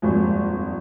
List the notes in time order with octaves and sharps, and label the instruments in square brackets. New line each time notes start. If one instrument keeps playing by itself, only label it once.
[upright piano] D#1 G#1 F2 G#3